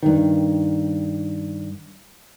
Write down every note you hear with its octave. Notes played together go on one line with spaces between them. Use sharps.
G2 D#3